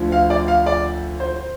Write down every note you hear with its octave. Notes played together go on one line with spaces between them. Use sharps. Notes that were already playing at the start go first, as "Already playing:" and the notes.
Already playing: D2 D3 F3
F5
D5
F5
D5
C5
C5